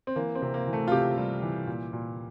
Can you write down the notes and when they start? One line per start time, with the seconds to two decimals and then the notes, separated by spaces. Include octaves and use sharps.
0.07 C4
0.16 E3 A#3
0.35 C4
0.42 C3
0.54 A#3
0.67 E3
0.73 A3
0.87 F4
0.92 C3 G4
1.17 G3
1.42 E3
1.67 A#2
1.93 A#2